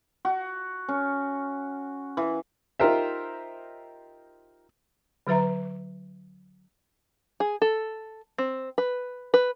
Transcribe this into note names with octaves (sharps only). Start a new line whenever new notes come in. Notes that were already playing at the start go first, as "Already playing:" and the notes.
F#4
C#4
E3
D#4 F4 G4 A#4 C5 E5
D3 F#3 B4 E5 A#5
G#4
A4
C4
B4
B4